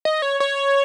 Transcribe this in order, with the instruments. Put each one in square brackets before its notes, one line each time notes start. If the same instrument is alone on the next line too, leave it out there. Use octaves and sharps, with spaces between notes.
[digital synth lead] D#5
C#5
C#5